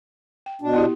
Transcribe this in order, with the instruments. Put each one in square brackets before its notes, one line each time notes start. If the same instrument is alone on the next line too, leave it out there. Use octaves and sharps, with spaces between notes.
[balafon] G5
[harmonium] B2 D4
[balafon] B3 E4 G4